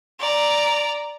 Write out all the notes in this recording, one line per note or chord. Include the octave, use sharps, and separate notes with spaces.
D5 A#5